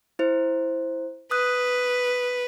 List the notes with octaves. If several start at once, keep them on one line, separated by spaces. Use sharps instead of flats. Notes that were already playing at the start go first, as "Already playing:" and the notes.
E4 C5
B4 D#6 F#6